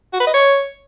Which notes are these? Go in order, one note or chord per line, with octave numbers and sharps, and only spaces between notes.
F#4
B4
D#5
C#5